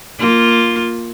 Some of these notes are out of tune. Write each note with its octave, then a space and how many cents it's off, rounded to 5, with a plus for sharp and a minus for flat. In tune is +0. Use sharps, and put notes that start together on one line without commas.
A#3 +0 F4 +0